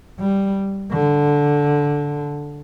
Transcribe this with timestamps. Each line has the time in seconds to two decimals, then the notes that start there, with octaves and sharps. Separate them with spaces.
0.20 G3
0.92 D3